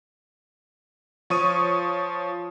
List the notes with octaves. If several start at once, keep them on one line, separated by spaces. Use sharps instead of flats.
F3 C#5 C#6 D#6 D#7